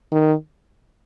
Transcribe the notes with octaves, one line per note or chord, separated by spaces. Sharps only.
D#3